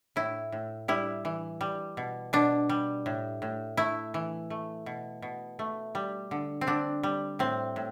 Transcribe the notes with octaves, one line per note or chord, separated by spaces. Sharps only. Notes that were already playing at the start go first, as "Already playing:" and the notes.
A2 E4
A2
G3 E4
E3
G3
B2
B2 D4
G3
A2
A2
A3 E4
E3
A3
B2
B2
A3
G3
D3
C4
D3 D4
G3
A2 C4
A2